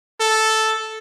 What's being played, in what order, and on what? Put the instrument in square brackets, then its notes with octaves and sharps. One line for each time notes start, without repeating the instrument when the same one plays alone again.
[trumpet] A4